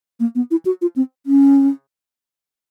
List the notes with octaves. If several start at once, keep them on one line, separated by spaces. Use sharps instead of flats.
A#3
B3
E4
F#4
F4
C4
C#4